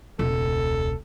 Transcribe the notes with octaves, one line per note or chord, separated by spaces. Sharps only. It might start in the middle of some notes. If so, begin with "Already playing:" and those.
E1 C#2 A4